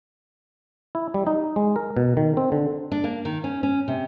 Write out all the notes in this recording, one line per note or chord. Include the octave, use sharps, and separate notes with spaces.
E4
G3
D#4
G#3
A#4
B2
D#3
C4
D3
D4
A#3
D#3
C#4
C#4
C3